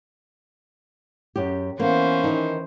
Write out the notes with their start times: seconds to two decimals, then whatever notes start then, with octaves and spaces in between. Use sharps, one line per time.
1.36 F#2 G4
1.80 E3 A#3 B3 C#4 C5
2.24 D#3 D#4